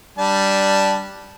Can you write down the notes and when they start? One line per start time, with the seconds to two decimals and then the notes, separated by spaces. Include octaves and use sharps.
0.18 G3 D4 A5